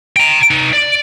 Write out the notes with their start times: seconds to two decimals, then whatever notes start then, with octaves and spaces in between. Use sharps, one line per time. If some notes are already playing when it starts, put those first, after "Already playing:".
0.17 G5 A#5
0.51 D#4 B4
0.73 D5